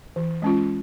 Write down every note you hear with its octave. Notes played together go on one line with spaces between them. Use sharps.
E3
G#3 C#4 F4